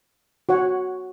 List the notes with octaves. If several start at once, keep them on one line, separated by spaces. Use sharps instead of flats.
F#4 C#5 F#5